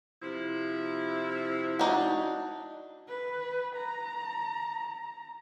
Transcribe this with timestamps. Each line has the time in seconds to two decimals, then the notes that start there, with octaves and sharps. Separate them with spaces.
0.22 C3 F3 E4
1.79 D4 D#4 F#4
3.08 B4
3.76 A#5